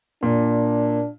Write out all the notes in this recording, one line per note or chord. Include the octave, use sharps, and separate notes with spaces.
A#2 D4